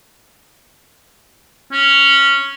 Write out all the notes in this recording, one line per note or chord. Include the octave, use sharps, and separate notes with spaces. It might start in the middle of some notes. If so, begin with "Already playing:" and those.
C#4